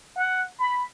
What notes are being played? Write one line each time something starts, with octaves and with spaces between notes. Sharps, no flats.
F#5
B5